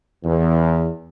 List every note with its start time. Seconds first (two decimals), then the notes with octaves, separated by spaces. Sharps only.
0.24 E2